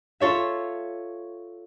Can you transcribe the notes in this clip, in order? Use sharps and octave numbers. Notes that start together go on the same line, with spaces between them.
F4 A4 C#5 E5